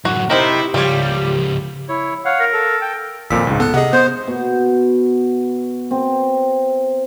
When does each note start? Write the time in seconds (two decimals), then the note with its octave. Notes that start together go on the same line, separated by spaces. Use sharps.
0.05 F#2 A2 F#4
0.30 C3 C4 D#4 E4 A#4
0.74 C#2 F3 G3 F4 C#5
1.89 E4 C#5
2.25 C#5 F5 F#5
2.40 A#4
2.53 A4
2.82 G5
3.30 G#1 F2 A#2 E6 B6
3.47 C#2 G#2
3.60 B3 A4 F#6
3.74 C3 G#4 D#5 F#5
3.93 B3 C5
4.27 B2
5.91 C4